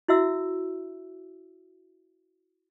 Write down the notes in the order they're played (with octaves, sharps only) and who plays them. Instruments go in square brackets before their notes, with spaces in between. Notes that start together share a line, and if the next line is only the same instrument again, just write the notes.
[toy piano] E4 F#4 E5 E6